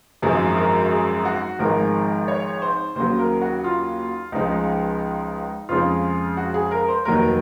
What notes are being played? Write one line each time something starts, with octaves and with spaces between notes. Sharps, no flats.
G#1 F#2 F3 G#3 G#4
A#4
G#4
F#4
G#1 G#2 F3 G#3 A#4
C#5
C5
D#2 C#3 F#3 C5
A#4
F#4
F4
C#2 C#3 F3 G#3 D#4
F2 C#3 F3 G#3 F4
F#4
G#4
A#4
C5
F1 D#2 D#3 F#3 A#4